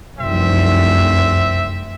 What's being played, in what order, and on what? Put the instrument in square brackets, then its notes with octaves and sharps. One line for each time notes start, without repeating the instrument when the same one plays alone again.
[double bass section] F1 C2 F#2 [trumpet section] C4 E5